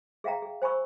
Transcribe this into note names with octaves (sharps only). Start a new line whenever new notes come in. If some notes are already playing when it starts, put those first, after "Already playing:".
G#4 E5 F5 G5 A#5
G#4
C5 G#5 B5 C#6 E6